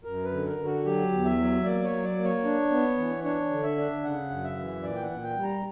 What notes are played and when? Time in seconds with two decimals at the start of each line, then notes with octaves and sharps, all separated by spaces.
0.04 F#2 A#4
0.25 B4
0.31 D3
0.46 A#4
0.58 D3
0.65 F#4
0.85 F#3 G4
1.12 E2
1.25 E5
1.38 F#3
1.64 A#3 D5
1.84 C#5
1.91 F#3
2.04 D5
2.17 A#3
2.24 C#5
2.44 D4
2.71 B3
2.98 E3
3.24 D4 C#5
3.50 D3
3.63 E5
3.78 D4
4.04 C#3 F#5
4.30 F#2
4.44 E5
4.57 E3
4.83 A#2 D5
4.96 G5
5.03 F#5
5.10 A#2
5.23 G5
5.36 G3
5.43 A#5